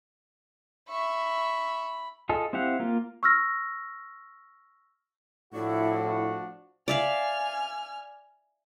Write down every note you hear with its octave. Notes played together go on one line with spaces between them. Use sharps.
E5 B5 C#6
F4 G#4 A4 D#5
C4 E4 G4 F5 F#5
A#3 F4
C#6 E6 F6 A#6
A2 F3 D4 E4 F#4
D5 E5 F5 G#5 F6